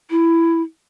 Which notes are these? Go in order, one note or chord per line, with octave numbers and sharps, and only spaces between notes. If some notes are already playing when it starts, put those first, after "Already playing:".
E4